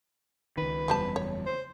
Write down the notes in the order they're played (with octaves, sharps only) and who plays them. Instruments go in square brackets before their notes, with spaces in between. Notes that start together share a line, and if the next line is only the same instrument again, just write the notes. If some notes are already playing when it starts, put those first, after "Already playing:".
[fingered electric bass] C#2 D#3 [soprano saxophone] B4
[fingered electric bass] F#1 E2 G3 [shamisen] F3 G4 A5
[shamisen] C#5
[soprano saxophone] C5